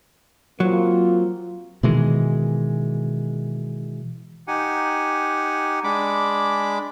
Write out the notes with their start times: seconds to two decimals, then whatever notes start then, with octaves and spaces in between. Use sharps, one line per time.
0.60 F#3 A#3 C4 F4
1.83 B2 D#3 E3 G#3
4.48 D#4 G4 F#5 G#5
5.84 G#3 D4 B5 D6